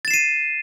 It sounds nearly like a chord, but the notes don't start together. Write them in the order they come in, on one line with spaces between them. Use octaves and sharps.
A6 E7 C7 D#7